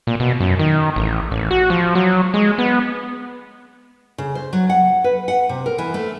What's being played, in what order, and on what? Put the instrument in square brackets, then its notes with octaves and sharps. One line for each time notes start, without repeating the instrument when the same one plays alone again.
[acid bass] A#2
B2
F#2
D#3
A1
A1
F#4
F3
F#3
G#3
B3
[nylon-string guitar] C#3
C5
F#3
F#5
B4
F#5
C3
A#4
E3
A3